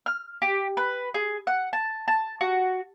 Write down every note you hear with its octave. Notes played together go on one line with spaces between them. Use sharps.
F6
G4
B4
G#4
F#5
A5
A5
F#4